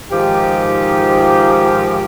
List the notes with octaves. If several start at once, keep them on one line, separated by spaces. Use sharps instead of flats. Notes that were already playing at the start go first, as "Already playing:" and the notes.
G#2 D#3 F3 G4